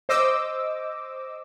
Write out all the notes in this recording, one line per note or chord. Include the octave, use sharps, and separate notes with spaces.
C5 D#5 D6 E6